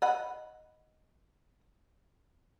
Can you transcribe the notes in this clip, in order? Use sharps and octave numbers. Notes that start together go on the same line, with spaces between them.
D#5 F#5 B5